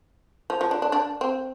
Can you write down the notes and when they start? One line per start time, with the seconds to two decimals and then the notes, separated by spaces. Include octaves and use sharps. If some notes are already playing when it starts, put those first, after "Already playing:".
0.50 F3
0.61 F3
0.71 D4
0.82 D4
0.92 D4
1.21 C4